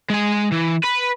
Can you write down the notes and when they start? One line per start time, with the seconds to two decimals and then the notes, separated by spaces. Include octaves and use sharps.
0.10 G#3 G#5
0.52 E3
0.84 B4